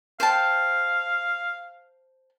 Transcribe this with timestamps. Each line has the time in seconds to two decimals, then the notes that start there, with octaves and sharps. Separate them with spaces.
0.20 C5 F5 G5 A5